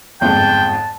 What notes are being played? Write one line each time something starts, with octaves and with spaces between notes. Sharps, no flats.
G1 F2 G#2 G5 A5